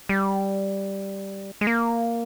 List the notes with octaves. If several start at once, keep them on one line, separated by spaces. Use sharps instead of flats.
G3
G#3
A#3